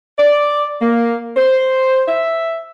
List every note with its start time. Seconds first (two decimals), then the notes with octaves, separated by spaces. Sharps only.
0.17 D5
0.81 A#3
1.36 C5
2.07 E5